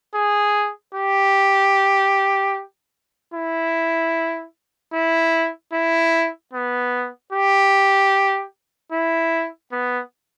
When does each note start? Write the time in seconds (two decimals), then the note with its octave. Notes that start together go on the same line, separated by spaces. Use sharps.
0.15 G#4
0.95 G4
3.34 E4
4.94 E4
5.73 E4
6.54 B3
7.32 G4
8.92 E4
9.72 B3